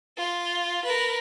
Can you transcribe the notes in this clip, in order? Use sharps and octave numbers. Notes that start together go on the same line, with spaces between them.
F4
A#4 B4